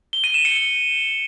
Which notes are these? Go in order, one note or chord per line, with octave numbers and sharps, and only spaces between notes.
G7
D#7
E7
C#7